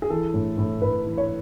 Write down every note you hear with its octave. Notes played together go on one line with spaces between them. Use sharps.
G#4
E3 A4
A2
A2
A2 B4
E3
C#5